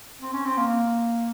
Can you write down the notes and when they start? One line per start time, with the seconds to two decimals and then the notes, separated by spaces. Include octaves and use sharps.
0.21 C4
0.33 C#4
0.45 C4
0.57 A#3